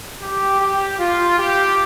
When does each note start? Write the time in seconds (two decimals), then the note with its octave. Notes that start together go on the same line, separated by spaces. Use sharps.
0.21 G4
0.60 G4
0.99 F4
1.39 G4